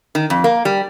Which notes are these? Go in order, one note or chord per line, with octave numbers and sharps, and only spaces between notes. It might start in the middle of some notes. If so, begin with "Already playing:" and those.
D#3
F2
A#3
G3